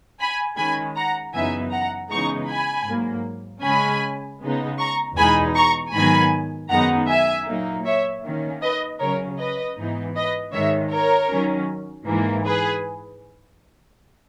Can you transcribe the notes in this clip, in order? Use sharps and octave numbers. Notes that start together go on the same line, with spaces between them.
G#5 B5
D#3 G#3 C#4 G#5 B5
F#5 A#5
F#2 C#3 E3 B3 D#4 E5 G#5
F#5 A#5
C#3 E3 G#3 B3 D#4 A#5 C#6
G#5 B5
G#2 F#3 A#3
C#3 G#3 C#4 G#5 B5
C#3 G#3 B3 D#4
A#5 C#6
E2 B2 G#3 D#4 G#5 B5
A#5 C#6
G#2 D#3 F#3 B3 G#5 B5
F#2 D#3 G#3 B3 D#4 F#5 A#5
E5 G#5
A#2 F#3 A#3 D#4
C#5 E5
D#3 A#3 C#4
B4 D#5
C#3 F#3 C#4 A#4 C#5
B4 D#5
G#2 E3 B3 D#4
B4 D#5
G#2 D#3 G#3 C#5 E5
A#4 C#5
D#3 F#3 C#4
G#2 E3 A#3
G#4 B4